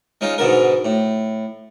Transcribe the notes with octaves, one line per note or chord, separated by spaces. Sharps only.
G#3 C#4 D#4 F4
G#2 B2 D3 A#4
A2